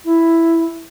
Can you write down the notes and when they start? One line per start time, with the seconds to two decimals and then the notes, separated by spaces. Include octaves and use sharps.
0.05 E4